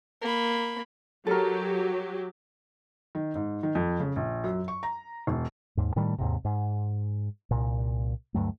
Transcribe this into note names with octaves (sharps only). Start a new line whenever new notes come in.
A#3 B5
F#3 G4 A4 A#4
D#3
G#2
D#3
F2
C#3
A#1
F#2
C#6
A#5
E1
D#2 G#2
A2 D#3 G3 A3
D#2 G#2 C3
G#2
C2 A#2
D2 G2 F#3 A3